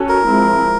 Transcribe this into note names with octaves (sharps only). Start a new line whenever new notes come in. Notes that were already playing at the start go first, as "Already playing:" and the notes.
Already playing: C#4 F#4 A4
A#4
F3 G#3 C4 E4